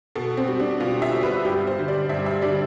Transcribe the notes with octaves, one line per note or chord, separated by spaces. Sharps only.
B2 A4
C4
G3
D4
B2 F4
E5
G3
B4
G2 G4
C5
D3 G3
D5
G2 E5
E5
D3 G3 D5